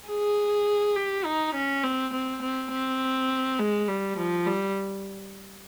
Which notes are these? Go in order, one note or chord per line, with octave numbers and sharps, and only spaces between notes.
G#4
G4
D#4
C#4
C4
C4
C4
C4
G#3
G3
F3
G3